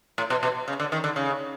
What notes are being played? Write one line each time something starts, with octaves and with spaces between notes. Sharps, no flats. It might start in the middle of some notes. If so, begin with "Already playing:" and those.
A2
B2
B2
C#3
D3
D#3
D3
C#3